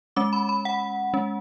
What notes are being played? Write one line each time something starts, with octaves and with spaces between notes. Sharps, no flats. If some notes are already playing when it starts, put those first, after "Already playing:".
G#3 C#4 D6
B5
B5
F#5
G#3 C#4